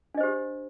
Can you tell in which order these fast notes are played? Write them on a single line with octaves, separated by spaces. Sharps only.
D4 D#5 C5 G4